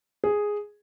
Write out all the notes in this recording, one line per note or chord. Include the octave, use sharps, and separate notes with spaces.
G#4